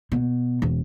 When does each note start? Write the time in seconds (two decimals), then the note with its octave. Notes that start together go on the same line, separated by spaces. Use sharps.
0.12 B2
0.62 E1